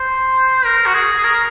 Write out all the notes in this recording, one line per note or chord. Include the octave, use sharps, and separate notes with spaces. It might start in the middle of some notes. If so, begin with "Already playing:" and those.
Already playing: C5
A#4
F#4
G#4
G#4
A#4